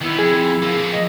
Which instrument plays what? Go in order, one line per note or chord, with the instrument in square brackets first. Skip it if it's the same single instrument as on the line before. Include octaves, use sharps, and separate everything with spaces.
[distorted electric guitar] D#3 B3 [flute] E4
[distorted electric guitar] F2 [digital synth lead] G#4
[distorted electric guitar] F2 A#3
[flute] D#5